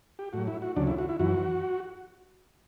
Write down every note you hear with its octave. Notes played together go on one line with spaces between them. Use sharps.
G4
A2 F#3 F#4
E4
F#4
D2 C#3 F#3 D4
E4
F#4
E4
F#2 E3 F#4